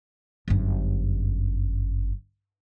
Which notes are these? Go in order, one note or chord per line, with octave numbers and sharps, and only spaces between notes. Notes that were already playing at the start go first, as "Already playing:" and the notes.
G1 F#2